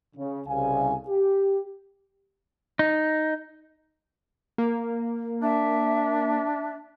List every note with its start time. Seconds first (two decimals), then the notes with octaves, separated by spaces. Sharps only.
0.16 C#3
0.47 C2 C#3 F5 G#5
1.08 G4
2.79 D#4
4.58 A#3
5.43 D4 E5